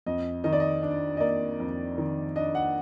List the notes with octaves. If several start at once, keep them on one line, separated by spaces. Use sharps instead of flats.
F2 D#5
D#3 D#5
D5
D#5
D4
D#5
A#3 D5
F2
D#3
D4 D#5
F#5